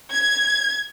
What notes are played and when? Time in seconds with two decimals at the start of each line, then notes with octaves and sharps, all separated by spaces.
0.10 G#6